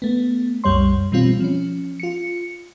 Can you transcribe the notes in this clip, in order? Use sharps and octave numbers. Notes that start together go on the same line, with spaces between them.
A3 B3
C2 F#2 G3 C#5 C6
B2 E3 G3 C4 F4
F3 C#4
F4 C#7